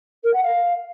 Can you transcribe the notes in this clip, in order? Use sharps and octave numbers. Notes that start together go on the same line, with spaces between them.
A#4
F#5
F5